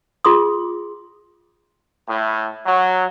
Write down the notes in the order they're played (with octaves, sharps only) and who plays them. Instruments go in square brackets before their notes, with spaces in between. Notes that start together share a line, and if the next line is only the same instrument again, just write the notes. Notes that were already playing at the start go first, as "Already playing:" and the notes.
[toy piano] F4 G#4 C6 D#6
[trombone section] A2
F#3